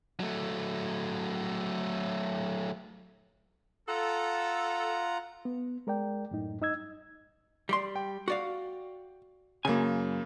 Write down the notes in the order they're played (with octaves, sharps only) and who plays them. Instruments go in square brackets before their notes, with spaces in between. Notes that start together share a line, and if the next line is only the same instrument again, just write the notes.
[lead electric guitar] F#3 A3
[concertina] F4 F#5 A#5 [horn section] A4
[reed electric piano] B3
G#3 A#4 D5 G5
F#2 A2 D#4
G2 D#4 D#5 E6 G#6
[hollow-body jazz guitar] G3 D5 C6
[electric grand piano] G5
[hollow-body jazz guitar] F#4 D5 F5
[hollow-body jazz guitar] F#2 G#5 [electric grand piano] C#3 A#3